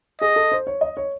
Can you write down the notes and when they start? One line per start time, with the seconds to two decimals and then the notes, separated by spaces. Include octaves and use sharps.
0.21 G#4 D#5
0.36 A4
0.52 C5
0.67 C#5
0.81 D#5
0.97 C#5